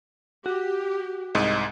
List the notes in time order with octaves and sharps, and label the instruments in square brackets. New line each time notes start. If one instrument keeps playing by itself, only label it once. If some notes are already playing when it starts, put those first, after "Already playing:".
[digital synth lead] F#4 [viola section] G4
[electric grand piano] C2 G#2 [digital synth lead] D#5